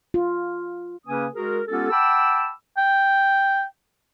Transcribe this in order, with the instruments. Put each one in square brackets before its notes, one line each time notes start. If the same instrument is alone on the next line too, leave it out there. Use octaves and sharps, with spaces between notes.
[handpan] F4
[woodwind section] C#3 A#3 C#4 B4 G#5 D#6
G#3 F#4 G#4 A#4
G#3 B3 C#4 F4 G4 A4
F#5 G5 A5 B5 D6 E6
[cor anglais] G5